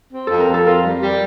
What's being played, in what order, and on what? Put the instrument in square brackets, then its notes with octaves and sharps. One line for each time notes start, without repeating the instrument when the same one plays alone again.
[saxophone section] C4
[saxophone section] F2 [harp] A4
[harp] A#4
[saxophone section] F2
[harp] A4
[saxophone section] F4 [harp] A#4
[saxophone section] G3
G3